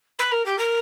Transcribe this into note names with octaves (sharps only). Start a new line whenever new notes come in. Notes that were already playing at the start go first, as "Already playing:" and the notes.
B4
A#4
G4
A#4